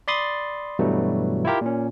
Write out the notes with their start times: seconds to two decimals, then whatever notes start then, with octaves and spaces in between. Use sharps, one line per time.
0.08 D5 B5 C6 D#6 A6
0.79 G2 B2 E3 F#3 G3 A3
1.45 E4 F4 G4 A#4
1.61 A#2 C#4